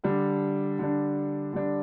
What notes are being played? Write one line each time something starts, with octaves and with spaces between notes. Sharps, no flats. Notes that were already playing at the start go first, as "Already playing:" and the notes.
D3 G3 D4
D3 G3 D4
D3 G3 D4